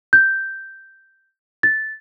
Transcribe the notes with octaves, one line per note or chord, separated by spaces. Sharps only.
G6
A6